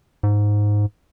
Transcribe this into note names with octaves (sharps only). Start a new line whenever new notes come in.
G#2